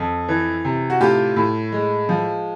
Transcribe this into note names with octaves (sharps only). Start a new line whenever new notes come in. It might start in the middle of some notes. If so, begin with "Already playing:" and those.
Already playing: F2
E3
C3
F#4
A2 F4 G4
A2
G#3
F3